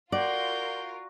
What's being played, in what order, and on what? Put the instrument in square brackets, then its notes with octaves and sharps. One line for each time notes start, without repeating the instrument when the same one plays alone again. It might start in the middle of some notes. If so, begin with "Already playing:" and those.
[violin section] F4 A#4 [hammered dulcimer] F#4 [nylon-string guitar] D5 [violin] C6 G6